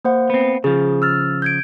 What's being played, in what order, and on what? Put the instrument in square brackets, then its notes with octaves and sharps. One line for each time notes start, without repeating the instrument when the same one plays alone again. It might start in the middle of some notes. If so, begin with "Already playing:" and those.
[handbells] A#3 C5 F#5
[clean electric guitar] B3 C4
[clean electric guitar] C#3 F3 [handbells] G#4
[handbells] E6 F6 A6
G6 G#6 D7